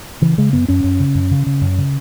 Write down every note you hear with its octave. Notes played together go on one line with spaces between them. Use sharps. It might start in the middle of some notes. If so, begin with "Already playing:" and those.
C#3 E3
C#3 G#3
F#2 B3
F#2 C#4
F#2
C#3
F#2
C#3
C#3
F#2
C#3